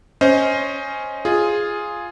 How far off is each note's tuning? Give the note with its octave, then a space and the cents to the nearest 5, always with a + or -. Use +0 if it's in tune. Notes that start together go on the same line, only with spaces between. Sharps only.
C#4 +0 C5 +0 D#5 +15
F4 +0 G#4 +0